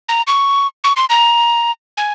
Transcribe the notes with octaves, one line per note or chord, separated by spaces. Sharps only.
A#5
C#6
C#6
C6
A#5
G#5